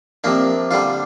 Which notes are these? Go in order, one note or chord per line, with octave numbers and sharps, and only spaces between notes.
C3 F3 A#3 D4
D3 G3 D4 F4